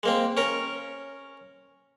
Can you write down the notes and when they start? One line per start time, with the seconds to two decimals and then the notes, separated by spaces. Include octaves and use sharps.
0.03 G#3 A#3 C4
0.37 C#4 A#4